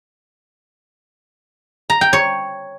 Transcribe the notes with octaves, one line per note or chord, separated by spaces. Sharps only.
A#5
G5
C#5